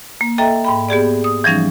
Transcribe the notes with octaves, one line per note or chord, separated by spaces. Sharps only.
A#3
A4 D#5 E5 G5 A#5
G#2 G5 B5
B3 G4 G#4 D5
D#6
E3 F3 G3 C#4 D#4